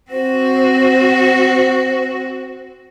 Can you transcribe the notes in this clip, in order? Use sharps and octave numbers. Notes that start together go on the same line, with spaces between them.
C4 F#4 C5